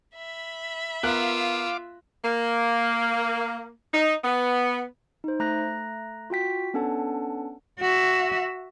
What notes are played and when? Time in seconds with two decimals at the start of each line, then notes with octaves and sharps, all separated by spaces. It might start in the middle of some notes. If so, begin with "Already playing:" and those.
0.15 E5 B5
1.03 B3 F4 A#4 F5 D6 E6 F#6
2.25 A#3
3.94 D#4
4.24 B3
5.24 D#4 C5
5.39 A3 A#5 F#6 A#6
6.30 F4 F#4 G5 B6
6.74 B3 C#4 D4 A4 F#5 A5
7.80 F#4 E5